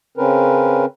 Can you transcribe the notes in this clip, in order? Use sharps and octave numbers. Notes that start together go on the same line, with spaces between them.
C#3 C4 C#4 A#4 B4